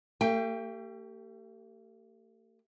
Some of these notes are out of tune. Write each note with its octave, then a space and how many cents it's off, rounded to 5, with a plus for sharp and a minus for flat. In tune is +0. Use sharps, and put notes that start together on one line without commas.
A3 +45 G4 +0 G5 +15